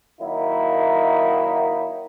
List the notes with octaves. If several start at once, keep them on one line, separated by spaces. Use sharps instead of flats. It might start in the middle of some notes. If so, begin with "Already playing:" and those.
D#3 F#3 A#3 D#4 E4